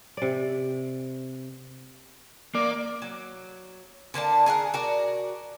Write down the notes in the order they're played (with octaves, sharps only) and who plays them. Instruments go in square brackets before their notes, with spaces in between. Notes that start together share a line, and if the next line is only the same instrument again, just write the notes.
[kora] C3 D5
[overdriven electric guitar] A#3 [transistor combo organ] D5
[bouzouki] F#3
D3 A#3 D4 A5
G#4 A#4 E5 F#5
F#4 A#4 D5